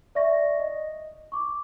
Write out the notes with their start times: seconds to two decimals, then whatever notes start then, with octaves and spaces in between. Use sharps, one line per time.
0.15 D5 E5 C#6 A#6
0.59 D#5
1.32 C#6 D6